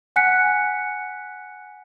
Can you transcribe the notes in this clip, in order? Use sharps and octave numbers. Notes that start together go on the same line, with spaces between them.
F#5 G#5 F#6 B6 C#7